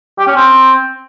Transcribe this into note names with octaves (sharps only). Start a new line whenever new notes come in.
G4
C#4
C4